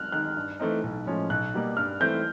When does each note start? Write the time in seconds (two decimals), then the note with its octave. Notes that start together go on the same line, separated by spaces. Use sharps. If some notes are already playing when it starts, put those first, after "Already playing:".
Already playing: F6 F#6
0.12 D#3 G#3 F#6
0.36 G2
0.59 E3 A3 C4 D#4
0.83 B1
1.06 A2 F3 G#3 C#4
1.30 B1 F#6
1.54 B2 G3 A#3
1.77 G2 F6
2.00 E3 A3 C4 E4 G6